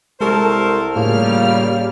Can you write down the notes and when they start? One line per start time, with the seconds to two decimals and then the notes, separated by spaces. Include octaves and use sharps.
0.21 C2 G#3 G4 A4 A#4 C5 C#6
0.96 A2 C#3 G3 A#3 F4 F6